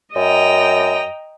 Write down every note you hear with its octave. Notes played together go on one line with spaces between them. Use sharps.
F#2 D#5 G5 A#5